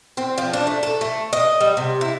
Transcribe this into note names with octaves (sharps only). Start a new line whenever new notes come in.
C4
F3
D4
A3
A4
A3
D#5
G3
C3
E4